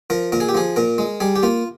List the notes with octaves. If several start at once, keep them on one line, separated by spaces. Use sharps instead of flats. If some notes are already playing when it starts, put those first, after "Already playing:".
F3 A#4
A#2 A#4
G#4
G4
F3 G#4
A#2 A#4
G#3
G3 G#4
G4
A#3 F4